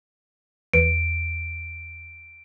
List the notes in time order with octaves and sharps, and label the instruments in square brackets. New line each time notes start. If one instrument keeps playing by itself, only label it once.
[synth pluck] E2 [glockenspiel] D7